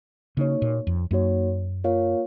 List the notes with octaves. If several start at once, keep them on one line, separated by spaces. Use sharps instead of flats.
C#3 A#3 D#4 F#4 C#5
A#2
F2
F#2 A#3 D#4 F#4 C#5
A#3 F4 A#4 C#5 F5